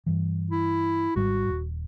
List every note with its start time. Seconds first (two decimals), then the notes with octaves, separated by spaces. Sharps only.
0.06 G2 E3
0.51 E4
1.16 G#1 G#2 G3 F#4
1.49 D#1